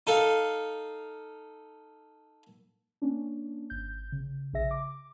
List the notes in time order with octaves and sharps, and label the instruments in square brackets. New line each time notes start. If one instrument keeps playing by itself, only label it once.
[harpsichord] D#4 A4 F5
[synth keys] A#3 C#4 D4
G#1 G6
C#3
A#1 C#3 G#4 E5 A#6
D6